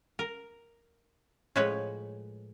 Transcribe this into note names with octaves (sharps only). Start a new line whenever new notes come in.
A#4
A2 F3 G#3 B4 C#5